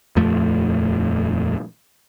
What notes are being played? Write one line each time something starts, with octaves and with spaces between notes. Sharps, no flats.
D#1 F2 F3 A3